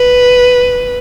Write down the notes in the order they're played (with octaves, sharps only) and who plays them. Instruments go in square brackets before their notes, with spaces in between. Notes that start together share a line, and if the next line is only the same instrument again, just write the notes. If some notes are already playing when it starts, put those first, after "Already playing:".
Already playing: [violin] B4